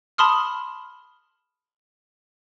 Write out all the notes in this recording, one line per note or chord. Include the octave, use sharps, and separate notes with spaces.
A5 B5 C6 D#6 F6